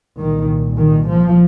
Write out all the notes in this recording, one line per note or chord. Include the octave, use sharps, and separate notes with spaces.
C2 A#2 D#3
D#3
F3